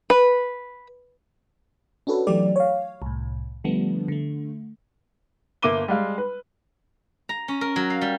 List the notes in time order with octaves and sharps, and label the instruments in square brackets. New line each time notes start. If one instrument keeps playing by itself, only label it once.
[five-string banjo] B4
[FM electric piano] C#4 D4 F#4 A4 B4
E3 F#3 A3 G4 D5
C#5 F5
C2 A2
D3 F3 G3 A3 B3 D4
D3 A3
[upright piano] G1 A#3 E5 D6 D#7 G7
G3 G#3 F5
B4
[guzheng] A#5
C#4
A#4
F#3
F5
G3